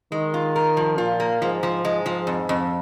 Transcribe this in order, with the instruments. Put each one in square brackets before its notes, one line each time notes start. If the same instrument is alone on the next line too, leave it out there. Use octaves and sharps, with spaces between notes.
[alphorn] D#3 [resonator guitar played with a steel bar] G#3
[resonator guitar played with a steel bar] F4
A#4
F3
[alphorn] A#2 [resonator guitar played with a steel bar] F4
[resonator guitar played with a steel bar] A#3
[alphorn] G#2 [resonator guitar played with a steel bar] F3
[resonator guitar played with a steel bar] F3
[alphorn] G#2 [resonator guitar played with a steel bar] G#3
[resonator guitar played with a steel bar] F3
F2
F2